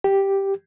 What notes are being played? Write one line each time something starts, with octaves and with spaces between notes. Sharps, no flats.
G4